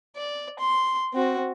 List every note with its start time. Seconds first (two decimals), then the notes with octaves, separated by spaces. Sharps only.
0.17 D5
0.59 C6
1.13 C4 F#4